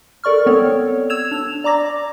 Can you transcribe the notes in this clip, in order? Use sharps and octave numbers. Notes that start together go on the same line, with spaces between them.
A4 A#4 D5 C#6 F6
B3 C4 A4 C#5
E6 G#6 E7 F7
D4 F7
D5 A#5 D6 A#6